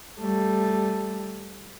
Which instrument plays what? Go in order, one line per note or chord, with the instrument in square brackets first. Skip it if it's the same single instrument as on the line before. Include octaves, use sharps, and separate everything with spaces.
[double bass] G3 A3